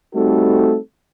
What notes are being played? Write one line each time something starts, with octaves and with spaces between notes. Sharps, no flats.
G3 A3 C4 D#4 F#4 A4